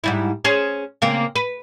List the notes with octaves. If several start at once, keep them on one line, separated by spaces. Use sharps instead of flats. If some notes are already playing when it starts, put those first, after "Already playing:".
G#2 G3 E4
C#4 G#4 C5
C#3 A#3 C4
B4